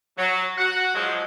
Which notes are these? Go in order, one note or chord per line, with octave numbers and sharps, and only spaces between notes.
F#3
F#4 F#5
F3 F#3 G#3